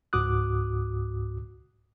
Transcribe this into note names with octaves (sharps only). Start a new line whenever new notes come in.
C#2 G#2 F#4 D6 D#6 F#6